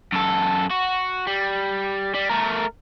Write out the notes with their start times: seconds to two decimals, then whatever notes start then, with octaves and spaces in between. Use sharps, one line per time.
0.12 F#2 A4
0.70 F#4
1.27 G3
2.14 G3
2.29 A3 A#4